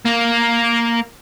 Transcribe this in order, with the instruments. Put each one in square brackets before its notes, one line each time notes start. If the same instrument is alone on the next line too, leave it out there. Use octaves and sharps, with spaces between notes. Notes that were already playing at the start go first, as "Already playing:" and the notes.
[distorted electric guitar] A#3